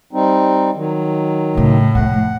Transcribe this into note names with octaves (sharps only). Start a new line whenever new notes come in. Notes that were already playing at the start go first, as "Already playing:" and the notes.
G3 C4 D#4
D#3 F#3
A2 C#3
F2 C3 F#5